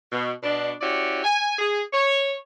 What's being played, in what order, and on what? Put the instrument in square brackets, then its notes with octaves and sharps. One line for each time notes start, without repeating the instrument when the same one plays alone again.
[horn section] B2
B2 D4
C#4 E4 F#4 G4 D5
G#5
G#4
C#5